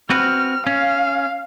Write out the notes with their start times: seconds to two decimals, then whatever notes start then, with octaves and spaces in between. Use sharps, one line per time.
0.10 C4 F#4 B4 F6
0.67 C#4 F5